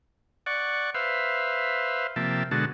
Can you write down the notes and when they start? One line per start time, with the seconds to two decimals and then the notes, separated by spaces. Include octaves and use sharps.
0.46 D5 F#5 C#6
0.95 B4 C5 E5 F5
2.16 C3 F3 A#3 E5 G5 A5
2.51 B2 D3 G#3 F#4 A5